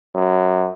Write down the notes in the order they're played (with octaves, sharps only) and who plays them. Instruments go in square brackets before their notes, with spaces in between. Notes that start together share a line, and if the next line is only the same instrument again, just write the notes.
[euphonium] F#2